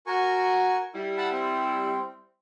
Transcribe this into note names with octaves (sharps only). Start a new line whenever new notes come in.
F#4 A#4 G#5 C#6
G3 E4
F#5 A5 B5
C4